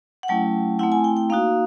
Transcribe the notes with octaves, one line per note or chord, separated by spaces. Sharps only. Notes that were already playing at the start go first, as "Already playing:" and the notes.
F#5
F#3 A3 C#4 E4 G5
A3 C4 E4 F#5
G#5
G5
G5
A#3 D#4 F#4 F5